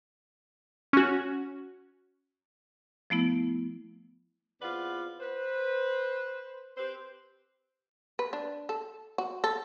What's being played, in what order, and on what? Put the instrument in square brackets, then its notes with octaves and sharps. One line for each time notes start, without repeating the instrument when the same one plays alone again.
[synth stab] C#4 F#4
[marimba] F3 A3 B3 E4
[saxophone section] E2 C4 F4 B4 D5 F#5
B4 C5
C4 G4 B4 C5
[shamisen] B4
D4
A4
F#4
A4